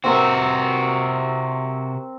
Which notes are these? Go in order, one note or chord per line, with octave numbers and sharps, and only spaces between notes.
C3 C4 F#4 A#4